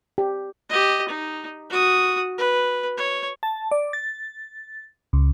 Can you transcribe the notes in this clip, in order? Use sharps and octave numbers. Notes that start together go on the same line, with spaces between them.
G4
G4 D#5
D#4
F#4 D#6
B4
C#5
A5
D5
A6
C#2